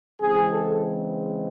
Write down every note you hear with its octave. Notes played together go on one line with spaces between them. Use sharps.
C#3 E3 G#3 C4 G#4
A4